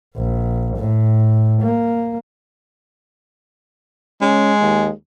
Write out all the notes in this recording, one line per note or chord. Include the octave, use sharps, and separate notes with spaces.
A#1
A2
A#3
G#3 C#4
D#2